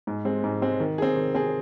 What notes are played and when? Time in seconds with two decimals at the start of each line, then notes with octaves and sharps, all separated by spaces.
0.07 G#2
0.25 G#3 C4
0.44 G#2
0.62 G#3 C4
0.80 D#3
0.98 C4 G#4
1.16 D#3
1.35 C4 G#4